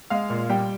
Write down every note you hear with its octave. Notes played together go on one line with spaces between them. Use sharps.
G#3 F5
A#2
G3 G5